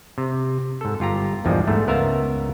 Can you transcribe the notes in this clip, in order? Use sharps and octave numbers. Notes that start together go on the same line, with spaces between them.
C3
G#2 A4
G1 F4 G4 A#5
A#1 E2 G2 F3 G3 G#3
G#2 A3
C#2 B3 A#4 E5 F5 A#5